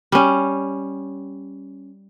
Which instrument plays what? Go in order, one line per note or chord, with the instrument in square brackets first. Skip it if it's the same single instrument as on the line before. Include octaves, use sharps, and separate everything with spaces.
[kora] G3 C#4